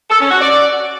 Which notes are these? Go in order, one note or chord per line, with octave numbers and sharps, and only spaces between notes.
A4
C#4
F#4
D5